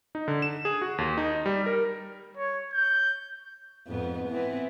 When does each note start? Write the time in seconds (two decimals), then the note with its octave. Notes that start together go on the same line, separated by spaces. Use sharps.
0.15 D#4
0.28 D3
0.42 E7
0.65 G#4
0.82 F#4
0.98 D#2
1.18 D#4
1.46 G3
1.66 A#4
2.37 C#5
2.74 G6
3.87 F2 G#2 B3
4.28 E3 B3 C4